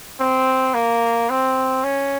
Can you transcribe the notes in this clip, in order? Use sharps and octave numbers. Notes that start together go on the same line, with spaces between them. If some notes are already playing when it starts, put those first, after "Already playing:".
C4
A#3
C4
C#4